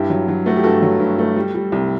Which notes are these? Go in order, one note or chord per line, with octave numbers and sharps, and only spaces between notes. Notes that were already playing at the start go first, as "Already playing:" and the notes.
Already playing: G2 E4 G4
F#3
F#3
A3 F#4
G4
G2 F#4 A4
F#3
G2
A3
G3
G3
C2